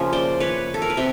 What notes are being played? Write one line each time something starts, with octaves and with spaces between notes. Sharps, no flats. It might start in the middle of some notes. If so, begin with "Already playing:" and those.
Already playing: C#3 F3 A#3 E5
C5 D5
B4 C#5
A4
A#4
B4
C3